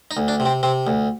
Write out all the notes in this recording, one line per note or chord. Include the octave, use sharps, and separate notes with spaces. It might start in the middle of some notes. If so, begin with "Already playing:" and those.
D#4
D2
D4
C3
C4
C3 C4
D2